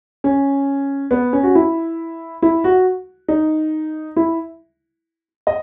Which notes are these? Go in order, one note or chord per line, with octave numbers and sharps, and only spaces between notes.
C#4
B3
C#4
F#4
E4
E4
F#4
D#4
E4
D#5